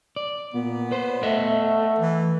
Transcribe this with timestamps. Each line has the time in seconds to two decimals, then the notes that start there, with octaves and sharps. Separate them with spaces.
0.16 D5
0.54 A#2 B3
0.91 B4 C5
1.23 A3 D#5 E5 F#5
1.99 E3